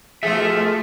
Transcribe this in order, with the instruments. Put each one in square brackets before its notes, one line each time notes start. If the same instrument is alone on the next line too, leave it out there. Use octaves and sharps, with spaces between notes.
[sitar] B2 F3 G#4 [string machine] A3 [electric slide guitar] A4 E5